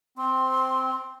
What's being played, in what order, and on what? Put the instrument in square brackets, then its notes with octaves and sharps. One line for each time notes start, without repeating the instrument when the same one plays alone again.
[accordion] C4 [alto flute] C6